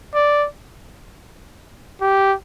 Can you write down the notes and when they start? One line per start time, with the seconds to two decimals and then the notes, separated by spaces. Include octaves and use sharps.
0.15 D5
2.01 G4